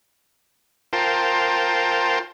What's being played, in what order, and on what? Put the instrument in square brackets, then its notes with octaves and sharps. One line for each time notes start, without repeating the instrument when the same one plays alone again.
[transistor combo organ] F4 A#4 C5 G5 A5